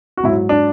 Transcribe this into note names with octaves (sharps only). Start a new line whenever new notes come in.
F#4
G#2 F#3 E4
D4